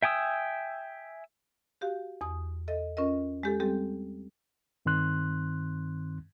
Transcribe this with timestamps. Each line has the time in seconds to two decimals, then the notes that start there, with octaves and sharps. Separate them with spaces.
0.03 E5 G5 G#5 D#6 E6
1.81 F#4 G4 F5
2.21 E2 D#6
2.68 A4 D#5 E5
2.97 C#4 F4 A#4 D#5
3.43 G#3 G4 A4
3.60 G3 C4 G4 A4
4.86 G2 D#3 C4 C6 F#6